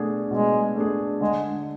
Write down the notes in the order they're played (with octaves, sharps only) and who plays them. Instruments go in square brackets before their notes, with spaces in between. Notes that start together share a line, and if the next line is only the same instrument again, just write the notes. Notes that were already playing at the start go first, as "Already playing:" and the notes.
Already playing: [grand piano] B2 A3 D4 G#4
[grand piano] B2 [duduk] G#3
[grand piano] A3 D4 G#4
[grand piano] D3 [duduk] G#3